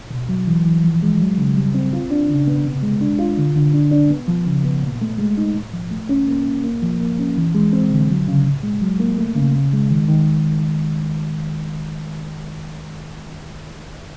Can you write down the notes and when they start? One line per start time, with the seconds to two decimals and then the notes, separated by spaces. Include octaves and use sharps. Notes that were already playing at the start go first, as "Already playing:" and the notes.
0.10 B2
0.29 F#3
0.47 E3
0.65 E3
0.84 F3
1.02 G#3
1.20 F#3
1.38 C#3
1.56 G3
1.75 C4
1.93 F4
2.11 D4
2.29 C#3
2.47 B3
2.65 C3
2.83 G#3
3.01 D4
3.19 F4
3.38 D3
3.56 D3
3.74 D4
3.91 D4
4.11 B3
4.28 F3
4.46 C#3
4.64 B3
4.83 A#2
5.01 A3
5.18 G#3
5.37 D#4
5.55 A2
5.73 F3
5.91 A3
6.09 C#4
6.27 A#3
6.46 A#3
6.64 A#3
6.82 F3
7.01 A#3
7.19 C#4
7.37 E3
7.55 G#3
7.73 C4
7.91 D3
8.10 F#3
8.28 C#3
8.46 A2
8.63 G#3
8.81 F#3
9.00 A#3
9.18 A3
9.36 C#3
9.54 C#3
9.73 G#3
9.90 D#3
10.08 D#3